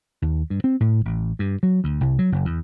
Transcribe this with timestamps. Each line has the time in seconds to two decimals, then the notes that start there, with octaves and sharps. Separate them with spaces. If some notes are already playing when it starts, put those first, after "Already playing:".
0.22 D#2
0.50 G2
0.64 C4
0.80 A2
1.05 A1
1.39 G2
1.63 F#3
1.84 D2
2.01 C2
2.19 F#3
2.32 F#1
2.45 E2